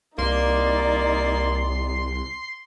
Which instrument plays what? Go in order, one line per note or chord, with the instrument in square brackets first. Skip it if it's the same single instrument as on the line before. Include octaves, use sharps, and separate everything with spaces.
[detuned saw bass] C2 [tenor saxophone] A#3 [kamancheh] D#4 D5 [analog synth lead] C6